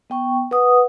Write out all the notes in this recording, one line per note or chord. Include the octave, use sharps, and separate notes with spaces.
B3 G5 C#6
B4 F#5 D#6